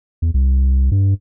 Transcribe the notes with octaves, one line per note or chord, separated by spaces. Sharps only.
E2
C2
G2